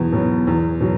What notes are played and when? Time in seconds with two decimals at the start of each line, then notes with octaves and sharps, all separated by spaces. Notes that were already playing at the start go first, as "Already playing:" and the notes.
Already playing: E2 B2 F#3 B3
0.13 B2 F#3 B3
0.47 E2
0.80 B2 F#3